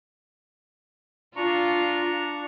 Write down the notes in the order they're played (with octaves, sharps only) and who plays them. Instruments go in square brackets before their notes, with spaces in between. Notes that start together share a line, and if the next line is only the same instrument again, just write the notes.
[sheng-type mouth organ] D4 A#5 C#6 [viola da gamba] F4